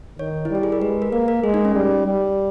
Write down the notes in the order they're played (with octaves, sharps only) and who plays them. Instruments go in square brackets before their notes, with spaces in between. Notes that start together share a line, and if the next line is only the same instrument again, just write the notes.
[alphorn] D#3 [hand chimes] C#5
[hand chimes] E4
[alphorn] G3 [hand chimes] G4
[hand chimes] G#4
A#4
[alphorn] G#3 [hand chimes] B4
[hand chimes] A#4
[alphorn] A#3 [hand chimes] A#4
[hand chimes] A#4
[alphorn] G#3 [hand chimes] G#4
[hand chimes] D#4
C#4
[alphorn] G3
G3